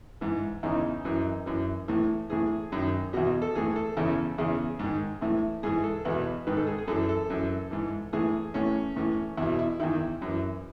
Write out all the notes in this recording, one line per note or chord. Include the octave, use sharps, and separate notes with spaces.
G#2 E3
E2 C#3 E3 D#4
F#2 E3
F#2 E3
A2 E3
A2 E3 G#4
F#2 D#3
E2 B2 F#4
A4
A2 E3 G#4
A4
E2 C#3 E3
E2 C#3 E3 G#4
G#2 D#3
A2 E3 E4
G#2 E3 G#4
A4
E2 B2 B4
G#2 D#3 B4
A4
G#4
G#4
F#2 E3 A4
A4
F#2 E3
G#2 E3
A2 E3 G#4
A2 E3 C#4
A2 E3
E2 B2 E4
E4
E2 D#3 E4
F#2 E3